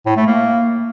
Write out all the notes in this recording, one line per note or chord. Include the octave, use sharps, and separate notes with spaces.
A2
A3
A#3